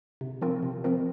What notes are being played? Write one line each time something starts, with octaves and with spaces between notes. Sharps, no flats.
C3
F3 C4 F4 A#4
C3
F3 C4 F4 A#4